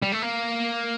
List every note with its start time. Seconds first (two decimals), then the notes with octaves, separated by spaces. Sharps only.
0.02 G3
0.12 A3
0.22 A#3